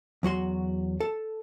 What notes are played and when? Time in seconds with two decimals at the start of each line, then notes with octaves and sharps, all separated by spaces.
0.23 E2 F#3 F#4 C6
1.00 A4